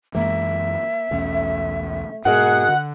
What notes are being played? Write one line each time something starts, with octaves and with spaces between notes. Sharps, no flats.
F#2 E3 G#3 A#3 E5
B1 E2 A3 C#4
G#2 B2 F#4 G#4 A#4 D#5 F#5
D3